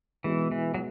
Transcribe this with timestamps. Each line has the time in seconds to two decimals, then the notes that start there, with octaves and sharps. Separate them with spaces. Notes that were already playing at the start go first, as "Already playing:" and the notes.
0.24 B1 B2 E3 G#3
0.52 E3
0.74 F#3